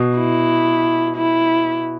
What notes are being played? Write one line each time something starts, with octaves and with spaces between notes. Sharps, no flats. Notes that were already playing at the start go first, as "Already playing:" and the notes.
Already playing: B2
E4
E4